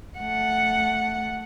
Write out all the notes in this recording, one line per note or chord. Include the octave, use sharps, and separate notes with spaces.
A3 F#5